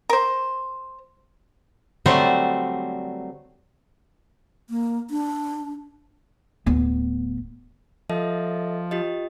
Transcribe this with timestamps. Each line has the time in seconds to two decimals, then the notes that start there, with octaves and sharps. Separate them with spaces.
0.09 A#4 C5
2.06 D3 F#3 G3 A3 C4 C5
4.70 A#3
5.10 D4
6.66 D1 B3
8.10 F3 A4 D#5 E5
8.91 F4 G4 D#5